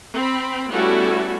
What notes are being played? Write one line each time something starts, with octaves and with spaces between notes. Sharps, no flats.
C4 B5
G3 A3 B3 C#4 E4 F#4